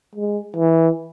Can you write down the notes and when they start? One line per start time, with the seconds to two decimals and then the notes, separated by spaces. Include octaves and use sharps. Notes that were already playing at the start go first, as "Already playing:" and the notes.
0.15 G#3
0.56 E3